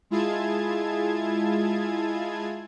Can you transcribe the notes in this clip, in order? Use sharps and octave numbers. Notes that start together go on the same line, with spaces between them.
G#3 E4 F4 G#4 A5 G#6